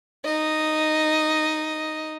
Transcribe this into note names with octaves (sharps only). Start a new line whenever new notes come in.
D#4 D#5